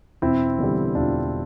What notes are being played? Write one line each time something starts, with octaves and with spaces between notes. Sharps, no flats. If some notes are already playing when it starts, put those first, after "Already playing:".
E1 C4 E4
E2 D3 G3
E1 D4 F4